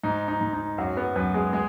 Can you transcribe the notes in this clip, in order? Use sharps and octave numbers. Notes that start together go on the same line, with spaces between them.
G#2 D#4
D#4
G#2
D#4
F#2 F#3 F#4
B3 B4
F#2 B3 B4
G#3 G#4
G#3 G#4